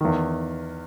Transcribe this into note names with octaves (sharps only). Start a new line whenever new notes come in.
E2 D#3